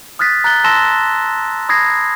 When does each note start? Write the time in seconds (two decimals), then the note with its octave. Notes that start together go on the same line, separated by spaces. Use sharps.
0.19 D#6 F6 F#6 A6 B6
0.44 A#5 F#6 A6 G7
0.64 A5 C6 E6 A#6 E7 G7
1.69 B5 D#6 G#6 A#6 C7